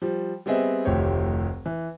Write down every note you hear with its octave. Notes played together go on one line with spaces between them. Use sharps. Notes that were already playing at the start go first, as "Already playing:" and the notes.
F3 G3
G3 B3 C4 G#4 D#5 E5
F1 D2 D#3 G4 C5 C#5
E3